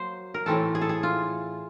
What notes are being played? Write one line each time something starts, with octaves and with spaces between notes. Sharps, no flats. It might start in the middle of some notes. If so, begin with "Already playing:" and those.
Already playing: F#3 A#3 C5
A#4
A2 E3 A3 C4 A4
G#4
A4
G#4
F4